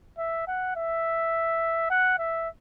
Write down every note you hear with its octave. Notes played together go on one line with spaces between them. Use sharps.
E5
F#5
E5
F#5
E5